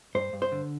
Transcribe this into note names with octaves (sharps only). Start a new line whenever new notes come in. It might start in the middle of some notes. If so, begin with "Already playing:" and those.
G2 C5
G2
C5
D3